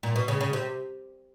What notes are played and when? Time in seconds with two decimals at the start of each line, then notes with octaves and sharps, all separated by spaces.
0.03 A#2
0.16 B2
0.28 C#3
0.41 C#3
0.53 C3